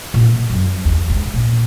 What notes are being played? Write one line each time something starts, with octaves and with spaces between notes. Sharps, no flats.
A#2
F#2
E2
G#2
A#2